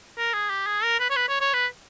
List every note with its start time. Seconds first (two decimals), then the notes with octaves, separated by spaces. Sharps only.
0.17 A#4
0.34 G#4
0.50 G4
0.66 G#4
0.83 A#4
0.99 B4
1.10 C#5
1.16 B4
1.29 C#5
1.41 C#5
1.53 B4